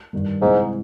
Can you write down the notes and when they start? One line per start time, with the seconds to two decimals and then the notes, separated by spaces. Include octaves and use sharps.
0.13 G2 D#3 G3
0.41 G#2 C3 E3 G#3